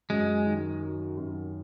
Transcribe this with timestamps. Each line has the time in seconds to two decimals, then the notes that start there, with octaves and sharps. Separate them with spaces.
0.10 F#2 G#3
0.46 D#3
0.82 F#3
1.17 F#2